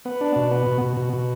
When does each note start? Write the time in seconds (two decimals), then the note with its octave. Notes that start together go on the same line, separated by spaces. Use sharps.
0.05 B3
0.21 D4
0.36 B2
0.51 B3
0.66 B2
0.81 B2
0.97 B2
1.13 B2